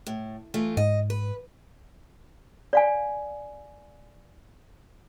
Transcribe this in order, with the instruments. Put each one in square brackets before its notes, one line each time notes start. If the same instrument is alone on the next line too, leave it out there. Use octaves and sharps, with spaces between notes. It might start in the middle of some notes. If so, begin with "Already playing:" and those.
[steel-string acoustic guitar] A2
E3 A3 F4
[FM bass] G#2 [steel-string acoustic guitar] D#5
[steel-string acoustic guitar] B4
[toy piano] D5 F5 G#5